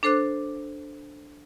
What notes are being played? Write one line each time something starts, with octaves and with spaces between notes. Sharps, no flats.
D4 A4 C5 D6 F#6